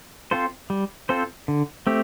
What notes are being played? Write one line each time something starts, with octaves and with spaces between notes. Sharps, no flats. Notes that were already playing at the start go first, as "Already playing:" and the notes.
C4 F4 A4 C5
G3
C4 F4 A4 C5
D3
A3 C4 G4